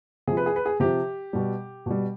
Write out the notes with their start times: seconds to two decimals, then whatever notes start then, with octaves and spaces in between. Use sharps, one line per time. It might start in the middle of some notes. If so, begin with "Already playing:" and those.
0.27 C3 F3 G#4
0.37 B4
0.46 G#4
0.56 B4
0.66 G#4
0.80 C3 F3 G4
1.33 B2 G3
1.86 B2 G3